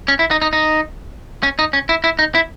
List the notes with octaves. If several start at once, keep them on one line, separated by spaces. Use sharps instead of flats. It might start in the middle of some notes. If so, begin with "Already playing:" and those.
C#4
E4
D#4
D#4
D#4
C#4
D#4
C#4
E4
E4
D#4
E4